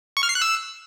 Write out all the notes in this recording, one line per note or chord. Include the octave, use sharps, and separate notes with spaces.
C#6
F6
C7
F#6
E6